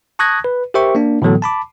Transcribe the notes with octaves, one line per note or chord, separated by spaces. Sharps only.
A5 C#6 D#6 F#6 G#6 A#6
B4
G4 A#4 C5 E5 G5 C#6
A#3 D4
A2 D3 E3 F#3 B3 A4
A5 B5 D6